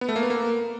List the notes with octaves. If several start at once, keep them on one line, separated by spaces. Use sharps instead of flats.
B3
A3
A#3
B3
A#3